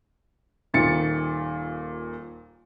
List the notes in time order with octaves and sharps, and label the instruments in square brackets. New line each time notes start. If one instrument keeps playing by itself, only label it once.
[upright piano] D#1 A#2 D#3 A6 C#7